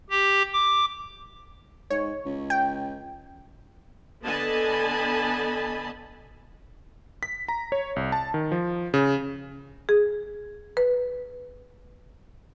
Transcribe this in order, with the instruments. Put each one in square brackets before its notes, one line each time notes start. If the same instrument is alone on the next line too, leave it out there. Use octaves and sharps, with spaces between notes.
[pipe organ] G4
D6
[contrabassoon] G#2 [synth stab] C#5
[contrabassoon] C#2
[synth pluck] G5
[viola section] D3 B3 D#5 G#5 A5 B5
[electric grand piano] B6
A#5
C#5
C2
A5
D#3
F3
C#3
[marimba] G#4
B4